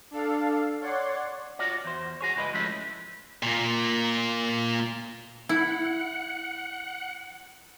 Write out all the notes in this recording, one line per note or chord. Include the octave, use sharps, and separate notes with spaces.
D4 A4 F5
C#5 D5 F#5 C6
F4 F#4 C#5 D5
E2 C5
F#4 G#4 C#5
C#2 G2 E4 B4 C#5 D#5
F3 G#3 A3 C#4 E4
A#2 A#3
E4 F#5